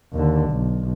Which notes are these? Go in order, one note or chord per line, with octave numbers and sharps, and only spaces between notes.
D#2 D3
B1